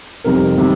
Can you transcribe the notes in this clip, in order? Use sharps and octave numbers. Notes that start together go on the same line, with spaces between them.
F2 C3 G3 D#4 A#4
C3 D#3 G3